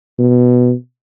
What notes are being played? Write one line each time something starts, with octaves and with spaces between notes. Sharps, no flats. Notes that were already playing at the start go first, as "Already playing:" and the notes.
B2